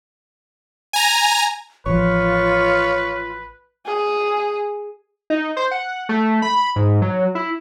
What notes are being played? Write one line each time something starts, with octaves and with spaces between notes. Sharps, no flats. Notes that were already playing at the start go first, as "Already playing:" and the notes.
G#5 A#5
A1 F3 F4 B4 C#5
G#4
D#4
C5
F#5
A3
B5
G#2
F#3
E4